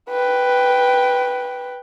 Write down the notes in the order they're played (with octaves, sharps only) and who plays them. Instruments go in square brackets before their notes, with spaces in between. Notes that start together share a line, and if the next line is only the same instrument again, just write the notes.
[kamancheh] B4 G5